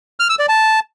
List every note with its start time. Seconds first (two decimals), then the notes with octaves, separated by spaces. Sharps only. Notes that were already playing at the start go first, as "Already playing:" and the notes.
0.20 F6
0.29 E6
0.39 D5
0.49 A5